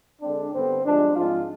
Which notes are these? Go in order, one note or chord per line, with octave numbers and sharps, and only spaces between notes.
D3 G#3 C4 D4
G2 D3 G3 B3 C4
G2 F3 G#3 D4
G#2 F3 G#3 C4 F4